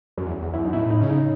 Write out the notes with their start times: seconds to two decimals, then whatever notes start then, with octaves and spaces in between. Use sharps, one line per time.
0.17 F#2
0.26 E2
0.41 E2
0.54 F#2 E4
0.64 D#4
0.73 B2 E4
0.78 A2
0.90 D#4
1.00 C#3 C#4
1.10 D#4